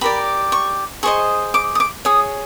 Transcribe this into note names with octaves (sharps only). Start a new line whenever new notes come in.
G4 A#4 D5 B5
C#6
G#4 C5 D#5 C#6
D6
D#6
D6
G#4 C#5 D#6